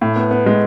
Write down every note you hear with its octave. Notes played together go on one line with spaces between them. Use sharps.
A2
B3
B3
G#3